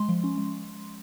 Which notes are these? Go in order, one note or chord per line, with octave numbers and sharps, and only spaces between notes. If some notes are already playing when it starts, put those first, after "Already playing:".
Already playing: G#3 C6
F3
C#4
G#3